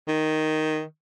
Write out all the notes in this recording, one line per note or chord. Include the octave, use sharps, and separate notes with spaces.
D#3